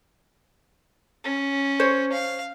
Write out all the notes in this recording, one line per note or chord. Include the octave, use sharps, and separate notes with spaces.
C#4
C5 C#5
F5